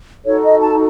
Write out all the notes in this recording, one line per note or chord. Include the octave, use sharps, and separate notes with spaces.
D#4 F#4 A4 C#5
D#5
A5